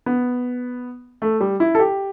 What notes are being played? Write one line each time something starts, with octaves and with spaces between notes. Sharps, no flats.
B3
A3
G3
E4
A4
G4